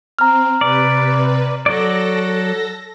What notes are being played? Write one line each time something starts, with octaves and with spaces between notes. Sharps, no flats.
C4 A#5 F6
C3 B4 D5
F#3 A4 D5 A#6